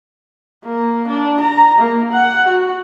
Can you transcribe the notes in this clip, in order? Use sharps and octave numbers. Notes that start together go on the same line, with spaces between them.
A#3
D4
A#5
A#3
F#5
F#4